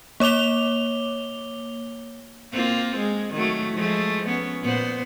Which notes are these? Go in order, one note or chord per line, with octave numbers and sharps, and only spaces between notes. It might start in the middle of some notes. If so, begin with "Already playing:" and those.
A#3 C#5 D6 F7 G7
A#3 C4 F4
G#3
D#3 F#3 A3
F3 G#3 A3
B3 C#4
A#2 B3 C5